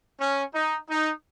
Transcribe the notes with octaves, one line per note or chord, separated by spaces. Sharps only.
C#4
D#4
D#4